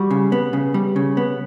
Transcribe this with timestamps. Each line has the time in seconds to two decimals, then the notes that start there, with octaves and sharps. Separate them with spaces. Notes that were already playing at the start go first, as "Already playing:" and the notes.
Already playing: G3 F#4
0.11 C#3
0.32 B3
0.53 C#3
0.74 G3
0.96 C#3
1.17 B3